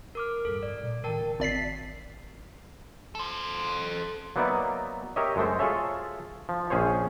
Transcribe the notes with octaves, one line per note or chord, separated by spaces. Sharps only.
A#4 D6 F6
D1 G2 A4
D5
A#2
A2 C3 D#3 A#4 G5 A5
D2
G#1 D5 B6 C7
A4 C5
F#3 A#3 B3 D#4 D5 E5
G4 A#4 C#5 D#5 E5
F#2 G#3 A3 C5
F4 G#4 A4 C#5 E5
F3
A#1 C#4 G#4 C5 C#5